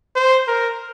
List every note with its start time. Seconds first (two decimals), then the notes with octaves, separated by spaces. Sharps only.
0.15 C5
0.48 A#4